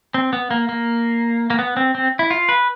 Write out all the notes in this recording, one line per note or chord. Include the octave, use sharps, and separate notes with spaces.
C4
B3
A#3
A#3
A#3
B3
C4
C4
E4
F4
B4